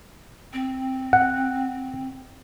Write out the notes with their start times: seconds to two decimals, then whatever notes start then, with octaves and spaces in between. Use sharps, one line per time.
0.53 C4
1.13 F#5